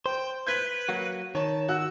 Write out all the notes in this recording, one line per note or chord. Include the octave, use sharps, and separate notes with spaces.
C5 G5
B4 G6 G#6 B6
F#3 A#3 F#4
D#3 C#5 A5
F#4 E6 F#6